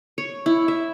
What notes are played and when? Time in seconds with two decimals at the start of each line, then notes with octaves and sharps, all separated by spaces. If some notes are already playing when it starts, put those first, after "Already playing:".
0.18 C#5
0.46 E4
0.68 E5